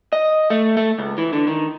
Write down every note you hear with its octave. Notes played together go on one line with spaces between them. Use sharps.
D#5
A3
A3
C#2
E3
D3
D#3